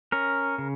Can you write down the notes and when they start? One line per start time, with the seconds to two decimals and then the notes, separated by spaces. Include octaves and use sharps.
0.12 C#4 A#4
0.58 C#3